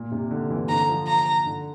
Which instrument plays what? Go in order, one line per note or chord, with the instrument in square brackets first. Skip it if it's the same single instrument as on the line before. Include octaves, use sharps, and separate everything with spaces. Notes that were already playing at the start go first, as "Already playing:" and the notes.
Already playing: [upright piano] A#2
C3
D3
E3
[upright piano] D3 [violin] A#5
[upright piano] F3
[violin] A#5
[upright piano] D3